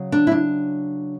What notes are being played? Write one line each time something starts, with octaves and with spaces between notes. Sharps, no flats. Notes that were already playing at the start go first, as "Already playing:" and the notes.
Already playing: C#3 F#3
D4
E4
D4